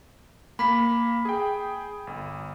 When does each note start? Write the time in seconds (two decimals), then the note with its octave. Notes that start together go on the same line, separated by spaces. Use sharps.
0.59 A#3 B5 B6
1.25 G#4 G5
2.07 G1